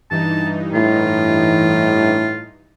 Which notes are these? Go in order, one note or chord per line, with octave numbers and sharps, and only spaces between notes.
G2 E3 D#4 A5
A2 F4